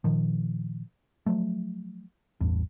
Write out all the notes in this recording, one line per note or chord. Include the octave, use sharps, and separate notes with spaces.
A#2 D#3 F3
F3 F#3 A3
A1 E2 G2